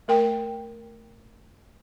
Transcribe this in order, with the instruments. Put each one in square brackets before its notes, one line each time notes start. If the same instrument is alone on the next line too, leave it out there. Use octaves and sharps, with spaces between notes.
[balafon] A3 A#4 G5